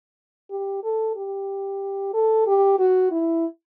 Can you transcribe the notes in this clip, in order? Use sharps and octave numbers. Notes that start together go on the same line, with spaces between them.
G4
A4
G4
A4
G4
F#4
E4